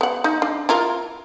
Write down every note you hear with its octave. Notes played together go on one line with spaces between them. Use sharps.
B3 F#5
D#4
D4
E4 F4 A#4